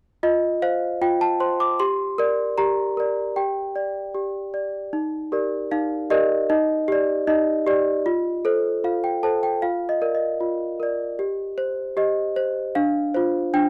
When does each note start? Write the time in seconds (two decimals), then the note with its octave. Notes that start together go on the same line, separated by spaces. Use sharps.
0.23 F4 D#5
0.62 C5 F5
1.02 F4 G5
1.21 A5
1.40 C5 C6
1.60 D6
1.80 G4 C6
2.18 A#4 D5
2.58 G4 A#5
2.97 A#4 D5
3.36 G4 G5
3.76 D5
4.15 G4
4.54 D5
4.93 D#4
5.32 G4 A#4 D5
5.71 D#4 F5
6.10 G4 A#4 D5 D#5
6.50 D#4 D#5
6.88 G4 D5
7.27 D#4 D#5
7.67 G4 D5
8.06 F4
8.45 A4 C5
8.84 F4 F5
9.04 G5
9.23 A4 C5 A5
9.43 G5
9.62 F4 F5
9.89 D#5
10.01 A#4 D5
10.15 D#5
10.41 F4
10.80 A#4 D5
11.19 G4
11.58 C5
11.97 G4 D#5
12.36 C5
12.75 D4 F5
13.15 F4 C5
13.54 D4 G5